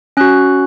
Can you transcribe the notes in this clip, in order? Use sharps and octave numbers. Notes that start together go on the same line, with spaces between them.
C#4 F#4 F#6